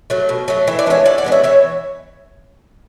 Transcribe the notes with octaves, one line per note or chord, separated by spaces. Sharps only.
F#3 A3
B2
F#3 A3
E3 E5
D5
G#3 B3 D4 C#5 E5
E3 D5 F#5
D5 F#5
G#3 B3 D4
C#5 E5
E3 C#5 E5